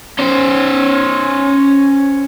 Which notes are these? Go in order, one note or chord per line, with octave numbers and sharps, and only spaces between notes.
C#4 C5